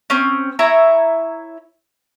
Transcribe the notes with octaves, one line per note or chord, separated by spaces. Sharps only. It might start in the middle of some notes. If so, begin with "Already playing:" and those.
C4 C#4
E4 C#5 E5 A#5